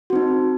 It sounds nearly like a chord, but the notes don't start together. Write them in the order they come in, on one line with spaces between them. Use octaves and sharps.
F#4 C4 D#4